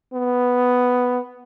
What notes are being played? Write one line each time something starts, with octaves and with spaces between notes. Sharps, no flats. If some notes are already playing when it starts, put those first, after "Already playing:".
B3